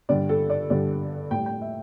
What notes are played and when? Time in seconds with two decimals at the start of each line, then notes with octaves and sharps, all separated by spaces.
0.09 G2 D3 G3 D5
0.29 A4
0.50 D5
0.70 G2 D3 G3 D5
1.31 A2 G3 G5
1.46 G5
1.61 E5